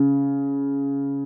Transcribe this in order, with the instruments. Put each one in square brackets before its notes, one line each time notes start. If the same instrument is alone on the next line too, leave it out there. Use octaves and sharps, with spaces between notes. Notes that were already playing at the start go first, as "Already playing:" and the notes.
Already playing: [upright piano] C#3